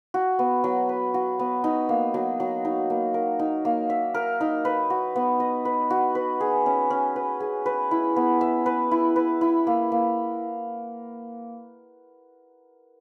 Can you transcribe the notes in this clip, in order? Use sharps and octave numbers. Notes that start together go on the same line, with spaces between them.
F#4
B3
F#3
B4
F#4
B3
D#4
A#3
F#3
F#3
D#4
A#3
A#4
D#4
A#3
E5
A#4
D#4
B4
F#4
B3
D#5
B4
F#4
B4
G#4
C#4
C#4
B4
G#4
B4
E4
B3
E5
B4
E4
B4
E4
A#3
A#3